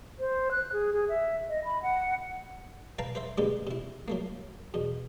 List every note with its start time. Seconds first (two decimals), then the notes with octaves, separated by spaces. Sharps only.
0.20 C5
0.51 F#6
0.73 G#4
0.93 G#4
1.09 E5
1.49 D#5
1.65 B5
1.83 F#5
2.99 B4 F5 G5 A5 A#5
3.15 B4 C5 E5
3.38 D3 G#3 A#3 G4 B4
3.67 C3 E4
4.08 F#3 A3 A#3
4.74 E2 B2